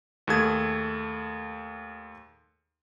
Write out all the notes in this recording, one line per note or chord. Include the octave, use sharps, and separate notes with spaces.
D#2 A3 G#4 G#6